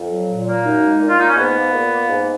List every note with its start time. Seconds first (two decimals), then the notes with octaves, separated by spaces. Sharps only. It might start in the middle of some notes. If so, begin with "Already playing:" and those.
Already playing: F2
0.09 F#3
0.27 A#2
0.46 A#3
0.64 F#2 D#4
0.82 G#3
0.99 A#2
1.09 F4
1.18 A#3 D#4
1.27 C#4
1.36 G#2 B3
1.54 A#3
1.72 A#2
1.91 A#3
2.09 G#2